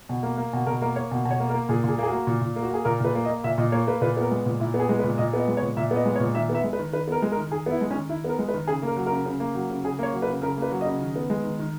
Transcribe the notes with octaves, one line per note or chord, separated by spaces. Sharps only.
B2
A#3
A#3
B2
B2 A#4
A#3 A#4
A#3 C#5
B2
B2
C#5
A#3
A#4
A#3
A#2 G#4
A#2 G#4
A#3 G#4
F#4
A#3
A#2
A#2
A#3
F#4
A#3 G#4
A#2 A#4
A#2 B4
A#3
D#5
A#3
A#2 E5
A#2 D#5
A#3 C#5
A#3 B4
A#2 B4
B3 A#4
G#3
A#2
A#2 E4
B3
G#4
G#3
B4
A#2
A#2 D#5
B3 D#5
G#3
C#5
A#2
A#2 E5
B3 D#5
G#3
C#5
A#2
D#3 E5
B3
E5
G#3
B4
D#3
D#3 B4
B3 A#4
G#3
A#4
D#3
D#3 G#4
B3 E4
G#3
C#4
D#3
D#3 E4
B3 A#4
G#3
B4
D#3
C#3 G#4
A#3
A#4
F#3
A#4
C#3
C#3
A#3
F#3
C#3
C#3 G#4
A#3 C#5
F#3
B4
C#3
C#3 A#4
A#3 B4
F#3
C#3 D#5
D#3
B3
G#3
D#3
D#3